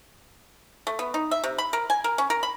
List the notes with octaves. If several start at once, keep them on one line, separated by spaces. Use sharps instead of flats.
A3
B3
D#4
E5
C3
B5
A#4
G#5
A#4
C#4
A#4
B5